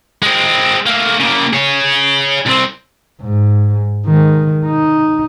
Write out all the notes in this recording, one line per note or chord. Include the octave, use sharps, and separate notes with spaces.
G#3 C4
A3 A#3
C#3 A#3
G#4 C#5
C2 C4
G#2
D#3 G#3
D#4